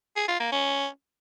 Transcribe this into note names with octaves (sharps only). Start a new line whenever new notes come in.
G#4
F4
A#3
C#4